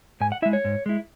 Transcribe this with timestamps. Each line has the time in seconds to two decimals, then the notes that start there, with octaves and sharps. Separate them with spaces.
0.21 G#2 G#5
0.32 F#5
0.42 E4 E5
0.46 G#3
0.53 C#5
0.65 G#2
0.86 G#3 E4